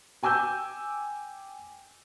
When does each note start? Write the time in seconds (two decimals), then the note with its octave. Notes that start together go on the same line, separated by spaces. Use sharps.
0.23 G5 G#5 D6 E6 G6